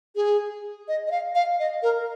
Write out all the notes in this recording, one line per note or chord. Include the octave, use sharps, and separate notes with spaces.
G#4
D#5
D#5
F5
F5
D#5
A#4